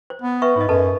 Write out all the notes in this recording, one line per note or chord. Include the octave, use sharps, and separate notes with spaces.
C5
B3
B4 E5 C#6
G#2 C#5 D#5
F#2 A4 B4 A5